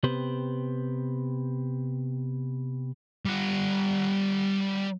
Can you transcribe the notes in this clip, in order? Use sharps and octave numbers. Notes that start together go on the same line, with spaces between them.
C3 B3 G4 B4 C5
G3 F#5